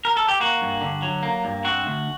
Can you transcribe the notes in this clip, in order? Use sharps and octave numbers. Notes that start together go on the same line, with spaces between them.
A#4
A4
G4
A#3 F#4
G2
D3
F#3
A#3
G2
C4 F#4
D2